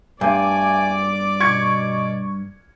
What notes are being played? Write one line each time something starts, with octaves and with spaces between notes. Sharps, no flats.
G2 A3 D5 G#5 D6
B2 C#6 G#6 C#7